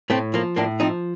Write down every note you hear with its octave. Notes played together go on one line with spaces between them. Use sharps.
A2 A3 C4
F3 A#3
A2 A#3 D4
F3 C4 D#4